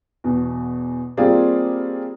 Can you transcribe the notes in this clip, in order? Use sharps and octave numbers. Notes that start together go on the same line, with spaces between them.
E2 B2
G3 A#3 C4 F4 G#4 D5